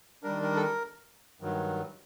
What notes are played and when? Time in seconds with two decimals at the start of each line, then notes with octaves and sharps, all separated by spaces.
0.23 D#3 G3 D4 A#4
0.42 A#4
0.56 A4
0.62 A#4
1.41 G2 D#3 F#3